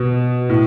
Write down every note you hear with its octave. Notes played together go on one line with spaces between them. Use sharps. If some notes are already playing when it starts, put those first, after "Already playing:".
Already playing: B2
A2